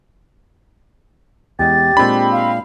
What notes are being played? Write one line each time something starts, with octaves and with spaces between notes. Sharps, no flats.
E2 G#3 G4 A6
A#2 G#3 C4 D4 B5
F5